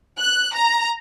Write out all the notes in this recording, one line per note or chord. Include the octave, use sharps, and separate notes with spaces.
F#6
A#5